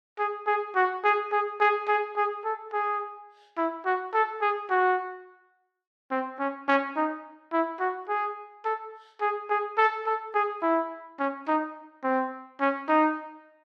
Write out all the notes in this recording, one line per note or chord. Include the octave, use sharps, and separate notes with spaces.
G#4
G#4
F#4
G#4
G#4
G#4
G#4
G#4
A4
G#4
E4
F#4
A4
G#4
F#4
C4
C#4
C#4
D#4
E4
F#4
G#4
A4
G#4
G#4
A4
A4
G#4
E4
C#4
D#4
C4
C#4
D#4